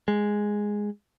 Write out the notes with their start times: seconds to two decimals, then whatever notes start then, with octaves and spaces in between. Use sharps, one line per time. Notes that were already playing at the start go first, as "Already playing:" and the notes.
0.08 G#3